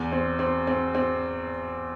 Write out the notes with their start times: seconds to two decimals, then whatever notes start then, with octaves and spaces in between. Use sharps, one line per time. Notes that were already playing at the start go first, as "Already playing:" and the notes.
Already playing: E2
0.12 C4
0.39 C4
0.67 C4
0.95 C4